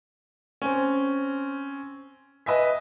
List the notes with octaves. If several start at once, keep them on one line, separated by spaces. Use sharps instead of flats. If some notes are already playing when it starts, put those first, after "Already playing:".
C4 C#4
B4 D#5 E5 G#5 B6